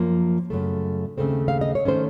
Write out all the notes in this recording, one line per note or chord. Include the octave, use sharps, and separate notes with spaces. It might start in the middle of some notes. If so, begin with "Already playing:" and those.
Already playing: F#2 F3 A#3
F#2 C#3 A3
D#2 C#3 A3 C4
F5
D#5
C#5
D#3 A3 C#4 C5